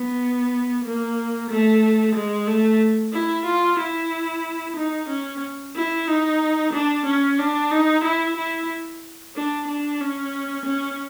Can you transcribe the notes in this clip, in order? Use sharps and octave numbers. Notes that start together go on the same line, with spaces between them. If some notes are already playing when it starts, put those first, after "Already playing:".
Already playing: B3
A#3
A3
G#3
A3
E4
F4
E4
D#4
C#4
E4
D#4
D4
C#4
D4
D#4
E4
E4
D4
D4
C#4
C#4